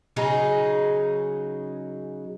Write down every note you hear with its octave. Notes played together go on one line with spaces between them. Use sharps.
C#3 F#3 D#4 G#4